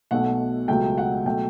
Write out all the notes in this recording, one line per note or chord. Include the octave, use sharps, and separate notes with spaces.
B1 B2 A3 F#5
C#2 B2 F#3 A3 G5
F#5
B2 F#3 A3 G5